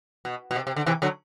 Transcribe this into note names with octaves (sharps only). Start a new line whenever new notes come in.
B2
B2
C3
C3
D3
C3 E3
D3 F#3